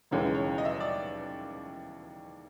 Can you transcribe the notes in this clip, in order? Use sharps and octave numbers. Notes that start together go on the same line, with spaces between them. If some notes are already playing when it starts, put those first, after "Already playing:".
E1 D#2 C#3 E3 G#3 C#5
C#5
D#5
E5
D#5
D5